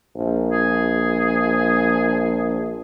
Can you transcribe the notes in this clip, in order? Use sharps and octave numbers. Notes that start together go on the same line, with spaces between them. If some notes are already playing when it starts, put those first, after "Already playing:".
A#1
G#4